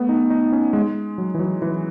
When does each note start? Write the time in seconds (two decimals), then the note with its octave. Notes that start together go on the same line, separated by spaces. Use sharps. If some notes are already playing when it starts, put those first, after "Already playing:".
Already playing: A3 B3
0.09 D#4
0.30 D#4
0.52 C#4
0.73 G#3
1.18 F#3
1.35 E3
1.39 F#3
1.62 E3